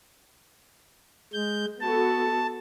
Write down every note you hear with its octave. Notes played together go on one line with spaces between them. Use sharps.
G#3 G6
B3 F#4 A4 A5